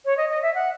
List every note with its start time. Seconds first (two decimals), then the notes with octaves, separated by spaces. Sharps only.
0.05 C#5
0.18 D#5
0.30 D#5
0.42 E5
0.54 F#5